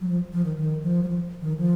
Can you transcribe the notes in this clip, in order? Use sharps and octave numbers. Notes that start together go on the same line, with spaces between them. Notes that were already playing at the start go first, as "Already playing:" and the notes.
F#3
F3
F3
D#3
D#3
F3
F#3
F3
D#3
F3